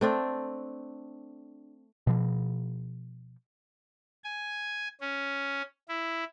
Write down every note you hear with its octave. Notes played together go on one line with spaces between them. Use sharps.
A3 C4 D4
B2 F3
G#5
C#4
E4